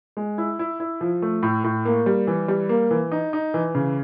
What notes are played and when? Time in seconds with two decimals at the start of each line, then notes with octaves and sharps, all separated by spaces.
0.17 G#3
0.38 E4
0.59 E4
0.80 E4
1.01 F3
1.22 A3
1.43 A2
1.64 A2
1.85 A#3
2.06 G3
2.27 E3
2.48 G3
2.69 A#3
2.91 E3
3.12 D#4
3.33 D#4
3.54 E3
3.75 C#3